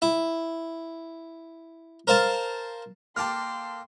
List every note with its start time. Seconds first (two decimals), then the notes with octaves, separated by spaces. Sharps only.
0.02 E4
2.07 A#4 C5 F5 A5
3.16 A#3 A4 G5 A5 C6 D6 F6